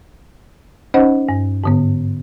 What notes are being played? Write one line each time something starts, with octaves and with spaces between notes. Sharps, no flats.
C#4 D#4 C5 D#5 F#5
G2
G#2 D3 B3